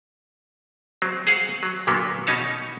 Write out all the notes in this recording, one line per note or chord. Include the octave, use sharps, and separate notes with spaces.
F#3 C4
G#4 C5 F5 F#5
F#3
A#2 D3 F#3 A#3 B3
B2 C#4 D#4 C#5 A5